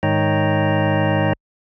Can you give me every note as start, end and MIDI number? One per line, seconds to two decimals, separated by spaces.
0.03 1.33 44
0.03 1.33 51
0.03 1.33 73
0.03 1.33 75
0.03 1.33 79
0.03 1.33 82